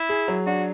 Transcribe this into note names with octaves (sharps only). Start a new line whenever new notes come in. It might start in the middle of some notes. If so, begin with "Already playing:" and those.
Already playing: E4
G#4
F#3
D4 F#4